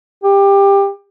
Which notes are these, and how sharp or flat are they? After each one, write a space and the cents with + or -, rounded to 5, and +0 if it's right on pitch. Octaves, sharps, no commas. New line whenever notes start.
G4 +20